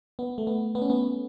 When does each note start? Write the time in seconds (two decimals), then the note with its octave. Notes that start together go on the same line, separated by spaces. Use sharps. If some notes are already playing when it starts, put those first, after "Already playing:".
0.19 B3
0.38 A3
0.47 B3
0.75 B3
0.82 C#4
0.90 B3